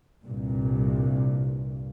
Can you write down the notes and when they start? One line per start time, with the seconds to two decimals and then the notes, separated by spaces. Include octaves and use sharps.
0.24 C2 G2 A#2